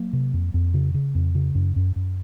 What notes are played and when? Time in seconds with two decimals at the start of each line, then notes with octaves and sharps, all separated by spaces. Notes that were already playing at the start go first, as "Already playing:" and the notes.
Already playing: F#3 A#3
0.13 C3
0.34 F2
0.54 F2
0.74 C#3
0.94 C#3
1.15 F2
1.35 C#3
1.55 F#2
1.76 F#2
1.96 F#2